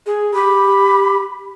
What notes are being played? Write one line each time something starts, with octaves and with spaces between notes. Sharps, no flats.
G#4
G4 B5